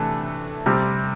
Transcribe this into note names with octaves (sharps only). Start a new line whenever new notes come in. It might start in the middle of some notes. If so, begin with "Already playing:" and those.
Already playing: C3 E3 A3 D4 A4
C3 G3 C4